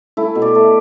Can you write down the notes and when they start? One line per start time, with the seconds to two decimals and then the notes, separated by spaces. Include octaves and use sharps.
0.17 A3 E4
0.35 B2
0.42 D5
0.55 A3